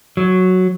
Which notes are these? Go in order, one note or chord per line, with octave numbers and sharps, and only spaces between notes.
F#3